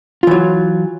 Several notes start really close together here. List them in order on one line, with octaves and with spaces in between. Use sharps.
F4 E3 F#3